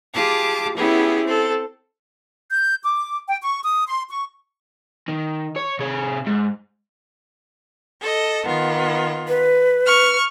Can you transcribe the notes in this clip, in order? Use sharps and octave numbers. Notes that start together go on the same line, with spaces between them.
F4 G4 G#4 A5 D6
B3 C#4 E4 G4 G#4
C4 A4
G6
D6
G5
C#6
D#6
C6
C#6
D#3
C#5
C3 G#4
G#2
A4 D#5
D#3 B3 F4
B4
C#6 F6